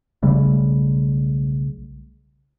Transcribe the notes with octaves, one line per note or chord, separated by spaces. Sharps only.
B1 C#3 G3 A3